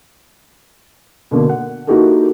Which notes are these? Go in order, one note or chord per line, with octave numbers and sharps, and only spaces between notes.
B2 D3 A#3
F#5
A#3 D#4 E4 F#4 G4 A4